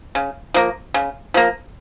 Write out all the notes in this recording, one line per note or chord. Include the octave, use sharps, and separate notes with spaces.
C#3
F3 A#3
C#3
F3 A#3